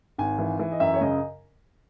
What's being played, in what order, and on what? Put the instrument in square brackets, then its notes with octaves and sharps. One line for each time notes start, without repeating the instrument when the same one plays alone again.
[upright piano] G#1 G#5
E3
E3
D#5
F#2 E5
C#5
C#3 D#5